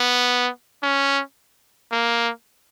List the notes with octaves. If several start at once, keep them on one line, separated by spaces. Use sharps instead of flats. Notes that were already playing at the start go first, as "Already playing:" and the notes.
Already playing: B3
C#4
A#3